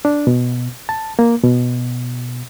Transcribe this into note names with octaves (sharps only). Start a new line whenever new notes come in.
D4
B2
A5
A#3
B2